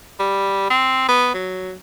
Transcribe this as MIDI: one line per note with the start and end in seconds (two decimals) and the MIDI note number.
0.19 0.66 55
0.70 1.04 60
1.08 1.30 59
1.34 1.73 54